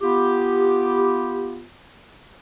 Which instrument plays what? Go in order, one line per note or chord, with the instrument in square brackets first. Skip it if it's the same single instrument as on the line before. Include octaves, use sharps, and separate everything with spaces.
[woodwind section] B3 F4 G4